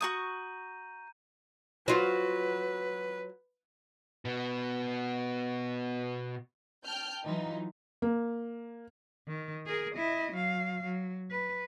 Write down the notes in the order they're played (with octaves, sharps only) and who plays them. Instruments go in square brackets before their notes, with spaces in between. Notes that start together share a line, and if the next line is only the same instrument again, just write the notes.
[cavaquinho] F#4 C#6 D#6 [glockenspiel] A#5 G6 D#7
[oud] F#3 F4 [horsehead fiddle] B4
[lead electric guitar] B2 B3
[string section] G5 A5 F6 G6
E3 F#3 D#4 F4
[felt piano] A#3
[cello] D#3
G#4 A#4
E4 D#5
F#3 F5
F#3
B4